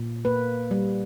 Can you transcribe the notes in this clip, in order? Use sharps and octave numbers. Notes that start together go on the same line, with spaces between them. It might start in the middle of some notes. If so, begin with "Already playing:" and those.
Already playing: A#2
A#3 B4
G3